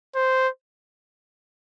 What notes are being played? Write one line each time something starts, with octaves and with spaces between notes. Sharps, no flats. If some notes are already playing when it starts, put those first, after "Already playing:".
C5